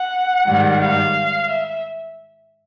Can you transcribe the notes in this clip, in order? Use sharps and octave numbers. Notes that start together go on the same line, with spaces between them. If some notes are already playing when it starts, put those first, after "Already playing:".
Already playing: F#5
G#2 D#3 G3
F5
E5